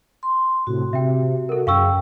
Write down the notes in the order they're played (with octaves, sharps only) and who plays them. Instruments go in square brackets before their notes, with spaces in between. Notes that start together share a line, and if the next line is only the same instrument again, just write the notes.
[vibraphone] C6
[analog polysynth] A2 C3 [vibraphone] F#4
[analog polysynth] C3 [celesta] E5 G5
[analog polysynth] F#4 [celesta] A4 A#4
[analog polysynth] F#2 C#3 [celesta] F5 C#6 E6 [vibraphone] G5